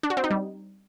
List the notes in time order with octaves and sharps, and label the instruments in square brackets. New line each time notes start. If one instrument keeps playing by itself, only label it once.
[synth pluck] D4
F#4
C4
D#4
G3